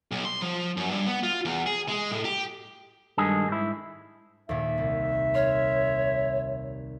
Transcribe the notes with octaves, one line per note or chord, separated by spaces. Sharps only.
B1
C6
F3
F#2
G2
B3
F4
E2
G#4
G#3
A2
G4
G2 D#3 G#3 G#4 A4
G#2 E4
D#2 A#2 E5
C2
C#5 C6 F6